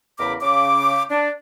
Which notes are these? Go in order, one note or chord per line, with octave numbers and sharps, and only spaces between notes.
E2 C#3 A#4 B5 D6
C#3 D6
D4